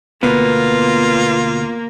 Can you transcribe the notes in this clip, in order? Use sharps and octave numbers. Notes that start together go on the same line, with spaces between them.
D2 B2 A#3 B3 F4